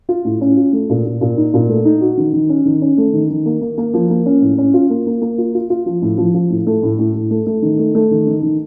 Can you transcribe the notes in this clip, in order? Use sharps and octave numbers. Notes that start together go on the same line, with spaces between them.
F4
A2
C#4
F4
A3
A#2
A#2
A#2
D#4
A#2
A3
D#4
F#4
D#3
D#3
C#4
D#3
C#4
A3
D#3
D#3
A#3
A#3
A#3
F3
A#3
C#4
A2
C#4
F4
A#3
A#3
A#3
F4
F4
F4
F3
A2
F3
F3
A2
A3
A2
A2
A2
A3
A3
D#3
A3
A3
D#3
D#3
D#3